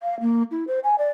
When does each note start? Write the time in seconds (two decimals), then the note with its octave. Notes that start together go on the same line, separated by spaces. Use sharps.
0.03 F5
0.20 A#3
0.51 E4
0.67 C5
0.84 G#5
0.98 D5